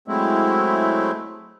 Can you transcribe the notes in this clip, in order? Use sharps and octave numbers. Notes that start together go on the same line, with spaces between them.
F#3 G#3 A3 C4 E4